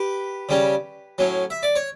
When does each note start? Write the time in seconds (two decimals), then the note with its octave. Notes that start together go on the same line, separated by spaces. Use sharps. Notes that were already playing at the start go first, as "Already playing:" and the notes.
Already playing: G4 B4
0.49 C#3 G3 C#4
1.18 A2 F#3 C#4
1.50 E5
1.63 D5
1.76 C#5